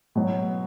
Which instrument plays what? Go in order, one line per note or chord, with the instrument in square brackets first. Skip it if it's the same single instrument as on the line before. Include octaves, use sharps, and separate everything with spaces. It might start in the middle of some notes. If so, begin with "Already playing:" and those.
[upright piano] B2 F#3